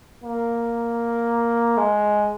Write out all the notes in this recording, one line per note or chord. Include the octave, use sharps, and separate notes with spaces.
A#3
G#3